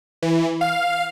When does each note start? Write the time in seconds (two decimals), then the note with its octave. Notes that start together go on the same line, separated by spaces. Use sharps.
0.22 E3
0.61 F5